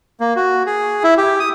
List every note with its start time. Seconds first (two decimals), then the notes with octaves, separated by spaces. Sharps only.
0.20 A#3
0.36 F#4
0.66 G#4
1.04 E4
1.18 G4
1.40 D#6